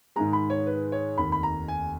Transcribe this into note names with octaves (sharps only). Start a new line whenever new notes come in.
G#2 D#3 G#3 A#5
B5
C#5
B4
C#5
F1 D#2 D#3 B5
B5
A#5
G#5